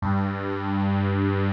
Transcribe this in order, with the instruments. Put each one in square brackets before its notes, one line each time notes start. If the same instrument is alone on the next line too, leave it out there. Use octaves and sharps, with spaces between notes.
[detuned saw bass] G2